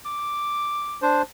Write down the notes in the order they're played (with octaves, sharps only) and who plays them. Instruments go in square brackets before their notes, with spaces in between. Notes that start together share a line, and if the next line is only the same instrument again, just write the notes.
[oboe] D6
[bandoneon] D4 C5